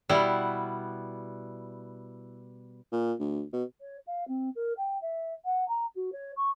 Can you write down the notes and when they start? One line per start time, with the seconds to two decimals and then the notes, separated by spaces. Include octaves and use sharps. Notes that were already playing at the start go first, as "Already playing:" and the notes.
0.09 B2 G3 B3 E4
2.92 A#2
3.19 D2
3.53 B2
3.81 C#5
4.07 F5
4.28 C4
4.56 A#4
4.77 G5
5.02 E5
5.45 F#5
5.69 A#5
5.96 F#4
6.13 C#5
6.37 C#6